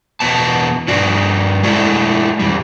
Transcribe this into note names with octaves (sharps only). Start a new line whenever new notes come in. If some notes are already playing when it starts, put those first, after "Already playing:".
E2 B2 B3 A5
G2 D4 F#4 D5
G#3 A3 D4 E4
E2 G2 G3